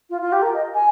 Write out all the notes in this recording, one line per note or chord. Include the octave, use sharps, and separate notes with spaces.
F4
F4
G4
A#4
D#5
G#5